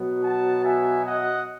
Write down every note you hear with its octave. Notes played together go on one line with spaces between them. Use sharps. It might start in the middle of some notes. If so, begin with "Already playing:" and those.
Already playing: B2 F#3 B3
F#5 A5
E5 G#5
D#5 F#5